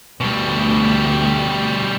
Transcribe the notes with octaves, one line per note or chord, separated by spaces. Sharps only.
D2 B2 G3